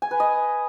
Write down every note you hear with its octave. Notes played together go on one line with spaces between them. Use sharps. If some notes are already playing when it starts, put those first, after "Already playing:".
G#5
B4
D#5